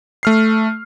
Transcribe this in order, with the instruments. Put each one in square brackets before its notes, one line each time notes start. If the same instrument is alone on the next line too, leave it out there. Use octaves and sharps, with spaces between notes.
[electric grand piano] A3 F6 C7